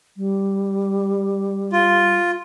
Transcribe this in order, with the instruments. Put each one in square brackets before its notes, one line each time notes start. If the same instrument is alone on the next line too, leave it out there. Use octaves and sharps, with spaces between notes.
[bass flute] G3
[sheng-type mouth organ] F4